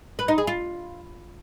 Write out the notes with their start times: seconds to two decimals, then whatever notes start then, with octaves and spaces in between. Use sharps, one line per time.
0.19 B4
0.28 D#4
0.38 G#4
0.47 F4